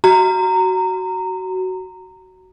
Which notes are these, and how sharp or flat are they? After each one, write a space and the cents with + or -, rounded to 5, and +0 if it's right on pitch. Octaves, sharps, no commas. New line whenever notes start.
F#4 +15 A#5 -15